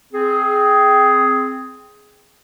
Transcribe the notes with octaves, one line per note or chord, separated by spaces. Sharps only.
C4 G#4